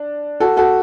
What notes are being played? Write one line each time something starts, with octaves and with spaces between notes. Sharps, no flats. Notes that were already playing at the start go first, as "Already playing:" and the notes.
Already playing: D4
F#4 A4
F#4 A4